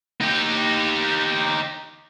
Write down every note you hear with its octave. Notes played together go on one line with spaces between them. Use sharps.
D#4 G4